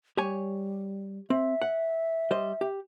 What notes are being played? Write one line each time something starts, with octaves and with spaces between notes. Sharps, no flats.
G3 G4 C#5 G#5
C4 E5
F#5
G3 C5 D#5
G4